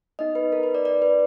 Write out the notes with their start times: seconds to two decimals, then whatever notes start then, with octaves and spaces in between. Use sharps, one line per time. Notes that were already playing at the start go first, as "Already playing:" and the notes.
0.19 B3 D#4 G#4 D#5
0.35 B4
0.52 A#4
0.63 B4
0.75 D5
0.85 D5
1.02 B4